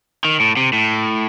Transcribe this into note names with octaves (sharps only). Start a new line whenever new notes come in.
D#3
A2
C3
A2